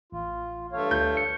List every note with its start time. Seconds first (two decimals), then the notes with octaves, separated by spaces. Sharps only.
0.12 A1 F4
0.73 G2 A3 C#5 F5
0.91 D2 G6
1.17 C#7